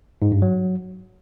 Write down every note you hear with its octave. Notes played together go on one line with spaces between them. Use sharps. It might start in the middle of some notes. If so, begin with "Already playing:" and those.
G#2
G2
F#3